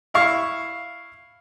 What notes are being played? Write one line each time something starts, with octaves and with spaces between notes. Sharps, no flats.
E4 F5 C#6